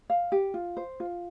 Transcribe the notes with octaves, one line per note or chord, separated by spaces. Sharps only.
F5
G4
F4
C5
F4